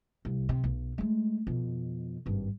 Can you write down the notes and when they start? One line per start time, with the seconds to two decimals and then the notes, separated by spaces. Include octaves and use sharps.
0.25 C2
0.49 C3
0.64 B1
0.98 G#3 A3
1.47 F2 B2
2.26 G#1 G2